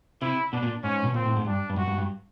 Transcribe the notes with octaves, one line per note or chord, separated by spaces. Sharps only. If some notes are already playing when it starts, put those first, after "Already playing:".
C3 E4
B2 D4
A#2
G#2 C#4
B2
A#2 C4
A2
G#2
G2 D4
G2
F#2 F#4
G2
G2